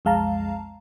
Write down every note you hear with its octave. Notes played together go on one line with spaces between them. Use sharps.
B1 F2 G#3 F5 A5 A#5